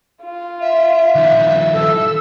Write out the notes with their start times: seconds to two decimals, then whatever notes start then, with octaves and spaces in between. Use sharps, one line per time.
0.22 F4
0.61 E5
1.15 D#3 F3
1.74 A4 E5 E6